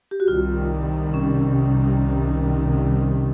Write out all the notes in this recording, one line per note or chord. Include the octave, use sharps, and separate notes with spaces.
G4
F#4
C2 C3 D#3 G3 F4
C#4